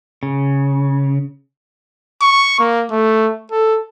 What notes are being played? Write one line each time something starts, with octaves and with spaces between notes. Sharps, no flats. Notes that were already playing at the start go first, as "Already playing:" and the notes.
C#3
C#6
A#3
A3
A4